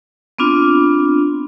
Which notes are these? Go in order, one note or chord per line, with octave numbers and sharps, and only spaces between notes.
B3 C4 D4 F4